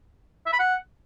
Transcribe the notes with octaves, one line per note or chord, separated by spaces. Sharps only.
E5
B5
F#5